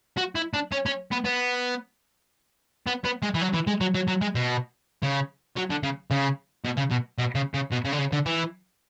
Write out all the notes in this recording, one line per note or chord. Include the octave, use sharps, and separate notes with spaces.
F#4
E4
D4
C#4
C#4
B3
B3
B3
B3
G#3
E3
F#3
E3
G#3
F#3
F#3
F#3
G#3
B2
C#3
F#3
D3
C#3
C#3
B2
C#3
B2
B2
C#3
C#3
B2
C#3
D3
C#3
D3
E3